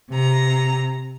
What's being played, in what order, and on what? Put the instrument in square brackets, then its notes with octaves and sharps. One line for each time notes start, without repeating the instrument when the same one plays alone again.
[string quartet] C3 A#5